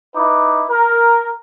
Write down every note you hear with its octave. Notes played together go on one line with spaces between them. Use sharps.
D#4 E4 B4 D6
A#4